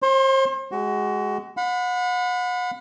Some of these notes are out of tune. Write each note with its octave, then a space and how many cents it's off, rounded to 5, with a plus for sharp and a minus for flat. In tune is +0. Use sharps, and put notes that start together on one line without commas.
C5 +40 C6 +0
G#3 +0 F#4 +25
F#5 -35 B5 +25